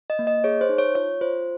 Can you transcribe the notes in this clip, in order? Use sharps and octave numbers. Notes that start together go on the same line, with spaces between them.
D#5
A#3
D#5
G#4 C#5
C5
D#4
C#5
F4 C#5
F4 C5